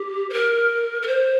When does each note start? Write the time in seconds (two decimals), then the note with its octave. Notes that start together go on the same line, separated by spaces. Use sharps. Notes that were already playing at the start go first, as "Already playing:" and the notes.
Already playing: G4
0.29 C5
0.32 A#4
1.02 A#4
1.06 C5